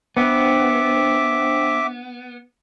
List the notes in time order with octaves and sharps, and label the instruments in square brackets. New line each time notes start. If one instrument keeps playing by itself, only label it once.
[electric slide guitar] B3 [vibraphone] D4 C5 G5 [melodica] E5 D6